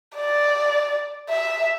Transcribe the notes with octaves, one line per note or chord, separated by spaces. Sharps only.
D5
E5